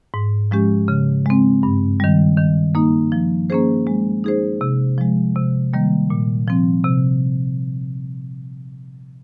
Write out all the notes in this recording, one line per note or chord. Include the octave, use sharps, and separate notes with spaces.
G#2
F3 G#3 C#4 G4
C#3
G#3 C4
G2
D#3 G3
D#3
A#3 D#4
F3
A#3 C#4 G#4 C5
G#3
D#4 G#4 C5
C3
F3 G#3
C3
D#3 G3 A#3
A#2
F3 C4
C3